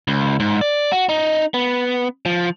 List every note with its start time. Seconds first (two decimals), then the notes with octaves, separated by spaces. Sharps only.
0.08 C#2
0.40 G#2
0.61 D5
0.92 F#4
1.09 D#4
1.54 B3
2.26 F3